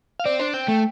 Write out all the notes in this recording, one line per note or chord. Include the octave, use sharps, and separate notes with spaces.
F5
C4 D5
D4 C5
C4 G5
A3